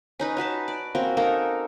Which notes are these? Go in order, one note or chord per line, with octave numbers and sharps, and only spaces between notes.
C#4 D#4 B4
C#4 F#4 B4 A5
D5
A#3 C4 C#4 F#4
A#3 D#4 A4 A#4